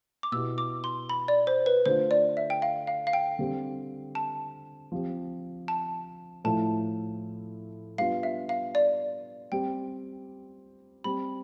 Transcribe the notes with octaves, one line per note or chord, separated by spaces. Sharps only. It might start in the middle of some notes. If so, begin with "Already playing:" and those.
D6
B2 B3 E4 G4 E6
D6
C6
B5
D5
C5
B4
D3 A3 D4 F4 C5
D5
E5
G5
F5
F5
F5
G5
D3 G3 C4 G4
A5
F3 C4 G4
A5
A2 F3 A3 E4 A5
G3 B3 D4 F4 F5
E5
F5
D5
G3 C4 G4 G5
G3 C4 G4 B5